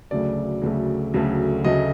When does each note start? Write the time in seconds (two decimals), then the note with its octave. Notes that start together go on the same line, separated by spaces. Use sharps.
0.11 D2 C#3 F#3 A3 D5
0.62 D2 C#3 F#3 A3
1.14 D2 C#3 F#3 A3
1.64 D2 C#3 F#3 A3 D#5